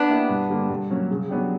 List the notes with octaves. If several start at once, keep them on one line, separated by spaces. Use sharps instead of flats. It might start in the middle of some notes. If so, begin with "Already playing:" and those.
Already playing: B3 D4
A#3 E4 G4
G2
D3 G3 A#3
G2
F#3 A#3 C#4
C#3
F#3 B3 D4 G4